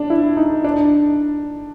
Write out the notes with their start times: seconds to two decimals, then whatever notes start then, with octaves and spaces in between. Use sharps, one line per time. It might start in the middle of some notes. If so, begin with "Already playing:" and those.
Already playing: D4
0.10 E4
0.37 D#4
0.64 D4